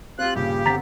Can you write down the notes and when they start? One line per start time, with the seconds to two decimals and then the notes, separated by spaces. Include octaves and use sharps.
0.19 C4 F4 G4 F#6
0.35 G2 A#2 C#3 G4
0.66 G1 C4 F#5 A#5 A6 B6